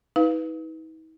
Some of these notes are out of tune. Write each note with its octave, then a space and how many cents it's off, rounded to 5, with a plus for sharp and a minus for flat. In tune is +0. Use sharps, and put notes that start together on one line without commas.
D#4 +45 B4 +0 F5 +0